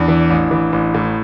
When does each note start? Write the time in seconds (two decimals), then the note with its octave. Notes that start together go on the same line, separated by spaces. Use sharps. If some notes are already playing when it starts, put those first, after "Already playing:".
Already playing: E2 D4
0.08 E3
0.30 A1
0.51 E3
0.72 A1
0.95 A2